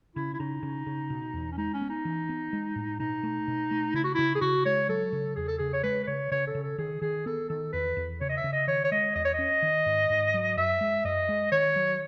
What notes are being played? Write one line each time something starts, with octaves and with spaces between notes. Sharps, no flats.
C#3 E4
E4
C#3 D#4
C#3
C#3
B2
E2
C#4
G#3 D#4
C#4
B3
D#4
E3
B3
G#3
A2
B2 D#4
A3
B2
A3
C#3 E4
F#4
C#3 E4
G#4
C#3 F#4
G#3 C#5
F#3 A4
C#3
E2 G#4
A4
C#3 G#4
C#5
G#3 B4
B4
C#3 C#5
C#3 C#5
A4
C#3
A4
D#3 G#4
D#3 G#4
B3 A4
D#3 A4
E2 B4
E2
C#3 C#5
D#5
E5
C#3
D#5
D#3 C#5
C#5
G#3 D#5
E2 D#5
C#5
C#4 D#5
D#3
G#2
G#2
F#3
F#2 E5
G#3
F#2 D#5
G#3
D#3 C#5
F#3